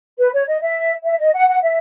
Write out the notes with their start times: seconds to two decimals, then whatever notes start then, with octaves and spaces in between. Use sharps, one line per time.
0.18 B4
0.33 C#5
0.47 D#5
0.61 E5
1.04 E5
1.19 D#5
1.34 F#5
1.48 F#5
1.62 E5